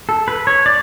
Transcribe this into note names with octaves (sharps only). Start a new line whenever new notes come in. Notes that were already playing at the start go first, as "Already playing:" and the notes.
A4
B4
C#5
D5